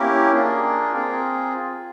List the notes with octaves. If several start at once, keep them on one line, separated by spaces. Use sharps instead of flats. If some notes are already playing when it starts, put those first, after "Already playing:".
Already playing: A#3 C#4 E4 G4 A#4
A#3 D4 F4 G#4
C4 F4 G#4 A#4